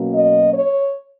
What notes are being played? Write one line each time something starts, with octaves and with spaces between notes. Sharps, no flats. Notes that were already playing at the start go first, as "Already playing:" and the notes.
Already playing: B2 F#3 A#3 C#4
D#5
C#5